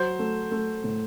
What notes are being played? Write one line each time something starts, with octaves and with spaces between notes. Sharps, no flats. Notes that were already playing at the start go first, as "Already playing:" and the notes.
Already playing: F#3 C5
A3
A3
A2